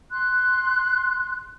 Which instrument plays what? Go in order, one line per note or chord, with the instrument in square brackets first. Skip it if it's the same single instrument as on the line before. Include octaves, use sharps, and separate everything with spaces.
[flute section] C6 F#6